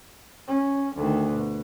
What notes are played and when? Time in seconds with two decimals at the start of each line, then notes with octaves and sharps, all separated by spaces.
0.48 C#4
0.95 D2 D#3
1.31 B2